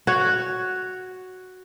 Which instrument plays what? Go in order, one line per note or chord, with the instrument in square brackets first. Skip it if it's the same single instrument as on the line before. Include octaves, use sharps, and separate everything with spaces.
[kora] F#4 C#5